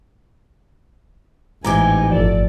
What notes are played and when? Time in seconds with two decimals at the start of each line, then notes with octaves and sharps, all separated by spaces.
1.64 A1 G#2 E3 D#4 G4 G#5 A#5 D6
2.12 G1 F3 A4 D5